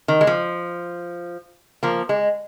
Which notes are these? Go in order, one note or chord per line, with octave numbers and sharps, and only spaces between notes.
D#3
G#3
F3
F3 A#3
G#3